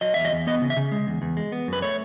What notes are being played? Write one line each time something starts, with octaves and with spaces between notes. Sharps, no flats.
F#3 D#5
E2 E5
D#5
E2
B3 D#5
C#3
E5
C#3
G#3
E2
E2
G#3
B3
F#2 B4
A3 C#5